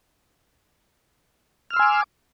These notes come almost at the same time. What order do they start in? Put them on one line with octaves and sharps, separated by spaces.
F6 E6 C6 G#5 D6